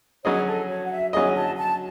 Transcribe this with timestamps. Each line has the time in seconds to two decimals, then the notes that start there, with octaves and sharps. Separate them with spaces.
0.24 F#3 C#4 G#4 C#5 D#5
0.47 A4
0.68 C#5
0.85 F#5
0.91 E5
1.13 F#3 C#4 G#4 D#5 G#5
1.35 A5
1.57 A5